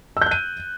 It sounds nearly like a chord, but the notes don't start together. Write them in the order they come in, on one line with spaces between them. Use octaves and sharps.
E6 G6 F#6 D#7